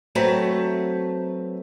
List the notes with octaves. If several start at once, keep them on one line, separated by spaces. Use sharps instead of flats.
F#3 A3 C4 B4 A5 A#5